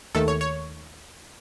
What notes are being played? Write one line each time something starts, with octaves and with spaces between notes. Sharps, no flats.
D#2 D#3 A3 A4
C#5
C#5